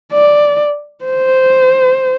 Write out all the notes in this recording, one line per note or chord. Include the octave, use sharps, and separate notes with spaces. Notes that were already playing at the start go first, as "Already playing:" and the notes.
D5
C5